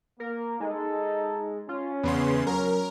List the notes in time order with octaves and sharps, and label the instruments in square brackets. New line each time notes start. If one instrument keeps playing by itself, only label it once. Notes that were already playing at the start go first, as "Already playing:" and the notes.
[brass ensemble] A#3 [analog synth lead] A#4
[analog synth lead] G#3 [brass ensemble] D#4 A4
[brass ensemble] C#4 [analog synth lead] F4
[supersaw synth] E2 C#3 C6 [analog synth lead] B3
[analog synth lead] F#3 [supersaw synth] A#4